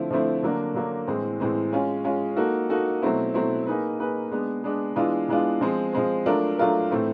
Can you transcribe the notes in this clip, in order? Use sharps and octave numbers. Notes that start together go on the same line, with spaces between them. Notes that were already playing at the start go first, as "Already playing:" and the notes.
Already playing: D3 F3 A3 C4 E4
D3 F3 A3 C4 E4
D3 F#3 A#3 D4
D3 F#3 A#3 D4
A2 E3 G#3 C4
A2 E3 G#3 C4
G#3 C#4 F4 G#4
G#3 C#4 F4 G#4
A#3 D#4 F#4 A4
A#3 D#4 F#4 A4
B2 F#3 A3 C4 E4
B2 F#3 A3 C4 E4
A#3 D#4 G#4 B4
A#3 D#4 G#4 B4
G#3 B3 D4
G#3 B3 D4
E3 G#3 B3 D4 F4
E3 G#3 B3 D4 F4
F3 G#3 C4
F3 G#3 C4
F#3 A3 D4 F4 A#4
F#3 A3 D4 F4 A#4
A2 E3 A3 C4 E4